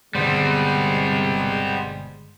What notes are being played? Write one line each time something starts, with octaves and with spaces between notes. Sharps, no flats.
G1 B2 D3 G3 G#3 B3 C4 C5